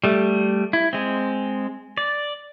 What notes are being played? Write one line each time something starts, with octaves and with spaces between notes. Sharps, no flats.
G3 A3
E4
G#3 C4
D5